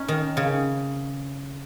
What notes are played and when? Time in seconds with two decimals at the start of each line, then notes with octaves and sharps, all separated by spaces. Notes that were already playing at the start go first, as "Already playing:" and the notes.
Already playing: C#4 D#4
0.08 D#3
0.37 C#3